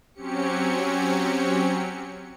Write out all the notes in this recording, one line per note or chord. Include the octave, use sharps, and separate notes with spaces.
F#3 C4 C#4 G4 C#7